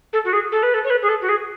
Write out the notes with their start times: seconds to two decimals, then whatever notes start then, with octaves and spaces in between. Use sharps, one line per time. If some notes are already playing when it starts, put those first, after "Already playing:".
0.13 A4
0.25 F#4
0.33 G#4
0.52 A4
0.63 B4
0.74 A4
0.84 C#5
0.90 B4
1.02 G#4
1.09 A4
1.22 F#4
1.29 G#4